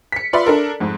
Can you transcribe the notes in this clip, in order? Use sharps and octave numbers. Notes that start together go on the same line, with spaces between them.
B6 C#7
F4 B4 D5 E5 B5 C6
D4 A4 A#4
F2 G#2